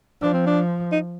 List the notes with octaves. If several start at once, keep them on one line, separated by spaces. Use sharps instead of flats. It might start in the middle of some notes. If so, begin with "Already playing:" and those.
F3 D4
C4
D4
D#4